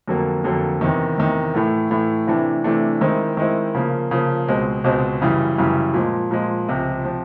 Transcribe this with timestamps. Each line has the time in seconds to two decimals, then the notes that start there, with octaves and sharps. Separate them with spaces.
0.08 F2 D3 F#3 A#3
0.44 F2 D3 F#3 A#3
0.81 E2 C3 D#3
1.18 E2 C3 D#3
1.55 A2 E3 A3
1.91 A2 E3 A3
2.27 C3 E3 A3 D4
2.64 C3 E3 A3 D4
3.01 D#3 G#3 C4 E4
3.37 D#3 G#3 C4 E4
3.75 C#3 F3 A#3
4.11 C#3 F3 A#3
4.48 C#2 B2 G#3 C4
4.84 C#2 B2 G#3 C4
5.21 F#2 C#3 E3 G3
5.58 F#2 C#3 E3 G3
5.94 A#2 F3 G#3
6.31 A#2 F3 G#3
6.68 C#2 C3 F3
7.05 C3 F3